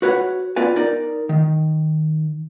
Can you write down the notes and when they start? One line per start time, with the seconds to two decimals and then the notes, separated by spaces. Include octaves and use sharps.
0.02 F#4 B4 C#5 F#5
0.56 B3 F4 B4 D5 G#5
0.76 D#4 A#4 D5
1.29 D#3